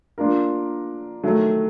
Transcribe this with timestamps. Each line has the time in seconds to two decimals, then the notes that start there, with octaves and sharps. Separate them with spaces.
0.18 A#3 D4 F4 A#4
1.24 D#3 F#3 A3